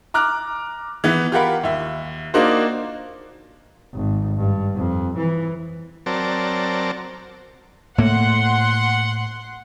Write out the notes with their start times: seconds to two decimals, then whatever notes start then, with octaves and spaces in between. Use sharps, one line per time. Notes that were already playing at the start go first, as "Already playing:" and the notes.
0.14 A#5 D6 F6 F#6
1.04 E3 B3
1.32 F4 G4 A#4 F#5 B5
1.64 D#2 E5
2.34 A#3 D4 D#4 F4 F#4 C5
3.93 G#1
4.37 G2
4.76 F2
5.18 E3
6.06 F#3 C4 A#4 D5 A5
7.98 A2 A#3 F#5 C6